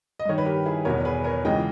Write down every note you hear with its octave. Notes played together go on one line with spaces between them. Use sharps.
D#5
G2 D#3 C#5
B4
G4 A#4
E4 G#4
E2 B2 A#4 C#5
G#4 B4
A#4 C#5
C#2 C#3 E3 D#5 G5